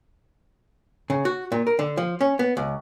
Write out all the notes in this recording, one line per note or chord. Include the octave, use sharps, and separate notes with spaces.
C#3
F#4
A#2
A#4
D3
F3
C#4
B3
C#2